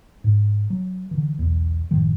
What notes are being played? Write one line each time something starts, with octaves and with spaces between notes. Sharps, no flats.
G#2
F#3
D3 E3
B1 E2
A1 F#2 D#3 F3